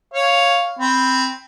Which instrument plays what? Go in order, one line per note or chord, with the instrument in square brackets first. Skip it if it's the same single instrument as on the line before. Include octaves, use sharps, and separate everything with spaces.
[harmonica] C#5 F5
C4 B5